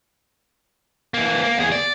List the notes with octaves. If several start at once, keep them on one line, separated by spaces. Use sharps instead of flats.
E3 A#3
A#3
E2 G#4
D5